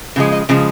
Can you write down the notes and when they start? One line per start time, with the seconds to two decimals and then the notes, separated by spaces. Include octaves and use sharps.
0.16 C#3 F3 G#3
0.32 D#5
0.49 C#3 F3 G#3